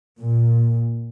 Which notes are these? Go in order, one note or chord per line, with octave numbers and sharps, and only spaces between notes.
A#2